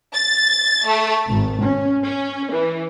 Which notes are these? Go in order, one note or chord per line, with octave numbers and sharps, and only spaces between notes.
A6
A3
G#1
C#4
C#4
E3